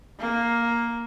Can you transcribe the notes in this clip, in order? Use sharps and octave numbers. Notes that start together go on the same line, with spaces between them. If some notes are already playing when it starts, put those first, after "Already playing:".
A#3